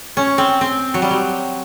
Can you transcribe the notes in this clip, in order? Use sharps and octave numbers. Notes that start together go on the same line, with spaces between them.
C#4
C4
C4
F#3
G3
F#3